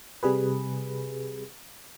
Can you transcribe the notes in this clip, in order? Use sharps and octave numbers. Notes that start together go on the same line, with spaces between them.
C3 G3 G#4 B4